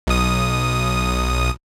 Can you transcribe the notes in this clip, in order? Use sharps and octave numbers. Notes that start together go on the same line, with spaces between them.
B1 D#6